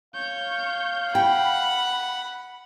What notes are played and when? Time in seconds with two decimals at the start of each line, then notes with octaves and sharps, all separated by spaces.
0.15 C#5 F5 G6
1.15 F#5 G5 B5